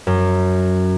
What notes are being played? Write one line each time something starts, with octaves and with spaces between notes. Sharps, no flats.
F#2